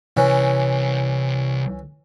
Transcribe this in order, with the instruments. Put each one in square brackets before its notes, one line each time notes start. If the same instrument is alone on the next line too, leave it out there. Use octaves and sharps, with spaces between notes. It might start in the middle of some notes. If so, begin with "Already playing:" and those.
[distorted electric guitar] C2 [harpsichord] E3 C#4